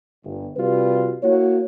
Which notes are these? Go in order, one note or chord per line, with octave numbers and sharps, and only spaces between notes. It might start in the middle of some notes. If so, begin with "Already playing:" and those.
G1
C3 G3 C4 F4 F#4 B4
A#3 E4 F#4 C#5